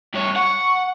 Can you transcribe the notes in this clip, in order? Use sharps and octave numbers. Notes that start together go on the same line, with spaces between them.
G2 C#5
F#5 C#6